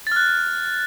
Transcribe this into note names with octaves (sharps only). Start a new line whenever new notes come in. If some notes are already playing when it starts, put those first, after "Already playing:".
F6 F#6 A6